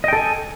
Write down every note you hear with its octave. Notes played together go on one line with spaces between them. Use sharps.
A4 D#5 G5 G#5